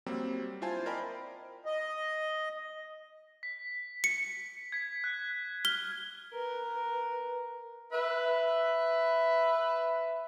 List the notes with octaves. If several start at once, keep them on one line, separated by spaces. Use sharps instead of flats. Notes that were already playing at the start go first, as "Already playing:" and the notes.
F#3 G3 A#3 C4
E4 F4 C5 G#5 A5
A#4 C5 D5 D#5 G5 B5
D#5
B6
C#7
G#6 B6
F#6
F6 G7
A#4 B4
B4 E5